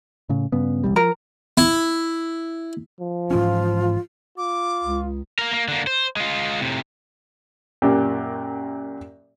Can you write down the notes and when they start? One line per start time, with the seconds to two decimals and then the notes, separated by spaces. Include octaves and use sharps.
0.29 A2 C#3
0.52 G2 C#3 B3
0.84 E1 C2 G3
0.96 F3 A#4
1.58 E4
3.00 F3
3.31 G#2 E3 C#4 F4
4.38 F4 D6
4.84 C#2
5.39 A#3 A#4
5.53 A#3
5.68 D3 A#3
5.87 C5
6.17 G#3 F4
6.60 A2 C3
7.82 F#2 A#2 G4